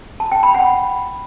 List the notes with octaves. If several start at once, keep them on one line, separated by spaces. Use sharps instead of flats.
A5
G5
B5
F#5